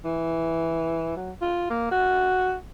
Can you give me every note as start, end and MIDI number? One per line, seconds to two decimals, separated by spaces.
0.05 1.13 52
1.17 1.32 54
1.42 1.67 65
1.70 1.89 58
1.91 2.55 66